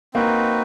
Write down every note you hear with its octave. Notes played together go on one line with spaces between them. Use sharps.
A#3 C4 D#4 F#4 B4